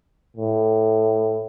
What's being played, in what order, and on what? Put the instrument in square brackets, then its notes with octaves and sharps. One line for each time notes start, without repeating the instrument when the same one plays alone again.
[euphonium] A2